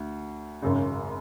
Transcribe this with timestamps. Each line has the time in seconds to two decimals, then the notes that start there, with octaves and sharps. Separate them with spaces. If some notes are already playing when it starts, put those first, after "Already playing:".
Already playing: D2
0.62 G#1 F#2 C#3